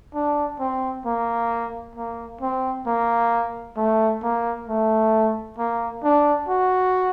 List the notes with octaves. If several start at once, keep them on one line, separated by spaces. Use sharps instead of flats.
D4
C4
A#3
A#3
C4
A#3
A3
A#3
A3
A#3
D4
F#4